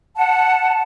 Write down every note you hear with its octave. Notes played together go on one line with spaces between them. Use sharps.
F#5 A5